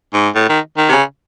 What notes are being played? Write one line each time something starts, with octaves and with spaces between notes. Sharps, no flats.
G#2
A2
D#3
D#3
C3
C#3